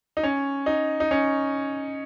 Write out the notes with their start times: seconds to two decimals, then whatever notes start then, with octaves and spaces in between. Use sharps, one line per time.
0.17 D#4
0.23 C#4
0.66 D#4
1.00 D#4
1.11 C#4